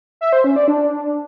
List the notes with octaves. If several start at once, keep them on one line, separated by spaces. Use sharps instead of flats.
E5
C5
C#4
D5
D4